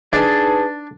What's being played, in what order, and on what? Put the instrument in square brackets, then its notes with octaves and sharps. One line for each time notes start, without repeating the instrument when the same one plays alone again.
[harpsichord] D4 [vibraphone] D#4 B4 A5 [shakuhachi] G#4